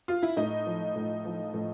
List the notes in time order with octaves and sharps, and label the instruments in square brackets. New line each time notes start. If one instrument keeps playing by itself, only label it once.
[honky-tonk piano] F4
E4
A2 D#4
F3
A2
F3
A2